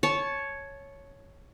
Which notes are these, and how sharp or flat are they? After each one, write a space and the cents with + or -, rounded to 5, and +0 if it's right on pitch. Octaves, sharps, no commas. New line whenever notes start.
C#5 +0 A5 -20